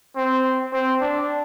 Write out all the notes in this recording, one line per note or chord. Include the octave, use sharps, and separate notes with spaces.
C4
C4
D4